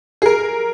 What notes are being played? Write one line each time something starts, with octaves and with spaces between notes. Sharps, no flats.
G#4
A#4